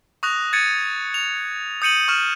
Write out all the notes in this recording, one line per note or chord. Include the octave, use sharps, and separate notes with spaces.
C#6 D#6 F#6 A#6 F7
G#6 A6 C#7 D#7
F7
D#6 G6 C#7 D#7 F#7
C#6 F6 E7